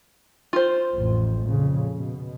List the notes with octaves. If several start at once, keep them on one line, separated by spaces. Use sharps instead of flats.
F4 C5
A1 F2
F2 A#2 C#3
B2